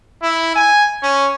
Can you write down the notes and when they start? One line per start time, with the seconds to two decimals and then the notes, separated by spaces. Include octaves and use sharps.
0.22 E4
0.55 G#5
1.02 C#4